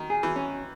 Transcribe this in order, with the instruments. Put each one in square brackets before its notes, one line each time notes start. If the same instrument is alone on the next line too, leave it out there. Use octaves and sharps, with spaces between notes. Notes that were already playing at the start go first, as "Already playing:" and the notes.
Already playing: [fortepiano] D#3
[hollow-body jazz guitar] G#4
[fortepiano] E3
[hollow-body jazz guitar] C#4